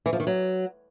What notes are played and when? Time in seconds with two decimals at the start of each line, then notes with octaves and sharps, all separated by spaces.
0.06 E3
0.13 F3
0.20 D#3
0.27 F#3